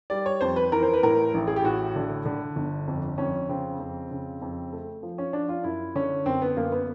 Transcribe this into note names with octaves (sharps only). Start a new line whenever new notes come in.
G3 D5
C#5
F2 C5
B4
E3 A#4
C5
B4
A2 A#4
A1
G#4
G4
A2 F#4
D3
D3
G1
F2
F2 C#4
C#3 C4
F2
C#3
F2
A3
F3
C#4
F3 D4
F4
F#2 E4
D3 C#4
F#2 C4
B3
F#2 A#3
B3